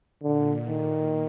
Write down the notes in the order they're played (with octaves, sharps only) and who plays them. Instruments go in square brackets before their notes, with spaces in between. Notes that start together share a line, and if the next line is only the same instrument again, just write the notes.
[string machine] A#2 [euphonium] D3
[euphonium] D#3